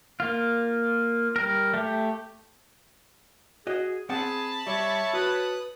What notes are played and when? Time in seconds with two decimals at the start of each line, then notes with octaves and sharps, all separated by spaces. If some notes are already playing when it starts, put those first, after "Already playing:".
0.20 A#3 F4
1.36 G3 A#4
1.74 A3 G4
3.67 F#4 G#4 D#5
4.10 C4 G#4 F#5 A5 B5
4.67 G3 C#5 E5 C#6
5.13 F#4 B4 D#6 F#6